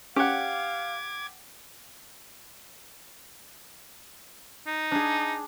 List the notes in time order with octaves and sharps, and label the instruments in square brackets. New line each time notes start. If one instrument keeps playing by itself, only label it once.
[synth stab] C#4 [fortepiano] G4 F#5 [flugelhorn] F5 [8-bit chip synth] D6 G#6
[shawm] D#4
[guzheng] D4 G#4